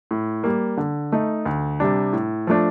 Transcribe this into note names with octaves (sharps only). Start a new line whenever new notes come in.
A2
G3 A#3
D3
A3 D#4
D2
C3 G3 D4
A2
F3 A3 D4